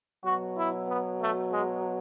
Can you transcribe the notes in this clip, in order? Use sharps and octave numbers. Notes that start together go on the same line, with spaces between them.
B2 F#3 F#4
E4
B3
A3
G#3